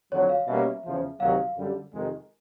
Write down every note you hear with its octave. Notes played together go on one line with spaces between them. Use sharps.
F2 D3 F#3 C#5
F5
B2 G3 A#3 C#4 E5
E2 C#3 F3
D2 C3 D#3 F#3 F5
F#2 D3 G3
F2 C3 D#3 G#3